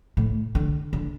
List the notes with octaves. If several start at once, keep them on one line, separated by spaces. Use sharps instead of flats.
A2
D3
D3